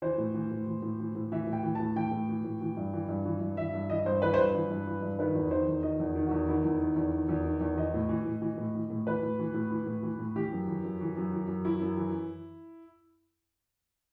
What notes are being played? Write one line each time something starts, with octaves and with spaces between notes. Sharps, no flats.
E3 C5
A2
E3
A2
E3
A2
E3
A2
E3 E5
A2
G5
E3
A2 A5
E3 G5
A2
E3
A2
E3
G2
E3
G2
E3
G2
E3 E5
G2
E3 D#5
G2 C5
E3 B4
C5
G2 B4
E3
G2
E3
G2
D#3 B4
E2
D#3 C5
E2
D#3 D#5
E2
D#3
E2 F#4
D#3 E4
E2
D#3
E2
D#3
E2
D#3
E2
E3 D#5
A2
E3
A2
E3
A2
E3
A2
E3 B4
A2
E3
A2
E3
A2
E3
A2
E3 G4
F#2
E3
F#2
E3
F#2
E3
F#2
E3 E4
F#2
E3